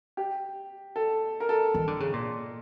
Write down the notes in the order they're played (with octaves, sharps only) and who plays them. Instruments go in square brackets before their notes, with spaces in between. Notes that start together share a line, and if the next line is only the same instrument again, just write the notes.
[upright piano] G4
A4
A#4
A4
[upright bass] E3
D3
C#3
A#2